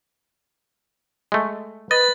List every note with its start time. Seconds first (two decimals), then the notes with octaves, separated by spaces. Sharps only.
1.32 G#3 A3
1.91 B4 D#5 A6